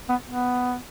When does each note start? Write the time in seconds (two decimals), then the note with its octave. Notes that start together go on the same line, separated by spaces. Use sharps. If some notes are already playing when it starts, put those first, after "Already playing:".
0.09 B3
0.27 B3